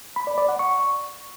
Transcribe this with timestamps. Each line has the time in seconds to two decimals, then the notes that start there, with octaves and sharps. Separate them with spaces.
0.16 B5
0.27 D5
0.38 D5
0.49 F#5
0.59 C#6